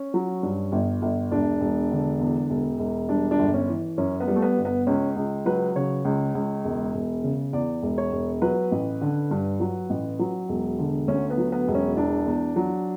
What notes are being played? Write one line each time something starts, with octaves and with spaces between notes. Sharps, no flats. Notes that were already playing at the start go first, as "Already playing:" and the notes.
Already playing: C#4
F#3
G2
G1
G1
E1 D4
E1
D3
E2
E1
E1
G3 D4
D4
G1
C#4
E3
F#2 C#4
B3
G3
A3
B3
G1
B3
C#2 C#4
C#2
F#3 B4
C#3 C#5
C#2
C#2
E1
E1
C#3
E2 D5
E1
C#5
E1
F#3 B4
A1
D3
G2
F#3
A1
F#3
E1
D3
D2 C#4
B3
F#3
B3
E1
C#4
E2 D4
E2
F#3